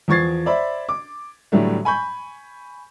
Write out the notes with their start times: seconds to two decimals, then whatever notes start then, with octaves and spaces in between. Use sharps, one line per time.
0.08 E2 F3 C#6 G#6 A6 C7
0.46 C5 D5 E5 B5
0.89 D6
1.52 A2 D3 E3 F#3 G3 A3
1.85 G#5 B5 C#6 G6